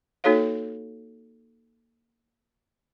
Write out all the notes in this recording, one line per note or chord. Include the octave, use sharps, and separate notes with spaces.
A#3 D#4 F#4 A4 C#5 F5